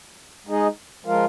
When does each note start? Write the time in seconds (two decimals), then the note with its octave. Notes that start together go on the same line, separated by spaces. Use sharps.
0.47 G#3 D#4 G#4 D#5
1.05 F3 G#3 F4 A#4 F5